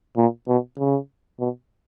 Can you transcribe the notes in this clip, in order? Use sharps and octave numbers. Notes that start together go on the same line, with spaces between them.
A#2
B2
C#3
B2